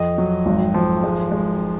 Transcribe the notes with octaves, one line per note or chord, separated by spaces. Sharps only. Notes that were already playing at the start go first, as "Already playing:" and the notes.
Already playing: F2 D#5
F#3
G#1
F3
G#3
G#3